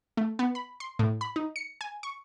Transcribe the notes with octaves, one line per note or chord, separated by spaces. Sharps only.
A3
B3
B5
C6
A2
B5
D#4
C#7
G#5
C#6